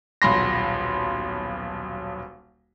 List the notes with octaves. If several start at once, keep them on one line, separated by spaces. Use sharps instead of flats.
D#1 B1 B5 C6 A#6